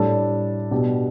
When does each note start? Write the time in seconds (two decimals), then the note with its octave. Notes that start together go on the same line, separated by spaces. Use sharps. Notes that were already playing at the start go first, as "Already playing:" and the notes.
Already playing: A2 G3 D4 A4
0.71 B2 B3 D4 G4